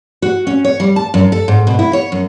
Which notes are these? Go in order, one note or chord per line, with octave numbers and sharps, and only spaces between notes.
F#4
C#4
C#5
G3
A5
F#2
A4
G#2
B2
E4
C#5
F#2